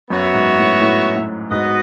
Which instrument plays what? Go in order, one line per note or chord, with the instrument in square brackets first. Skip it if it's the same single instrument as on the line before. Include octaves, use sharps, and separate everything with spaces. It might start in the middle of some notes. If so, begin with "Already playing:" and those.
[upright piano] F#2 [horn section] B3 F#4 C#5 E5
[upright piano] G#2
A2
A2
A2
[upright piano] G#2 [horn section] B3 F#4 B4 D#5